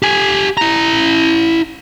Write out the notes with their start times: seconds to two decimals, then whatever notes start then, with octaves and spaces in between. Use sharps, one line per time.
0.02 G4 G#5
0.57 E4 A#5